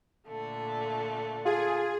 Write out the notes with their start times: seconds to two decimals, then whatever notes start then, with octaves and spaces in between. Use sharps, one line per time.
0.28 A#2 D3 A3
1.45 F4 G#4